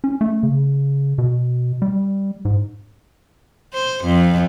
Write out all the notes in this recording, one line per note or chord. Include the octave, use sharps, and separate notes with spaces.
C#4
A3
C#3
B2
G3
G#2
C5
F2